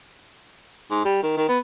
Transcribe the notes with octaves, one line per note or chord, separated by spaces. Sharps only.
G#2
G3
D#3
D#3
B3